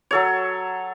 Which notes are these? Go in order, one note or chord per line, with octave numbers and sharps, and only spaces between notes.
F#3 A4 C#5